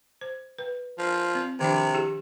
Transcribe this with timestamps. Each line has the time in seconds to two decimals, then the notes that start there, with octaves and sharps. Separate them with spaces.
0.21 C5
0.59 B4
0.99 F3
1.35 C4
1.60 C3 D#3 F3 D4
1.94 E4 G4 G#4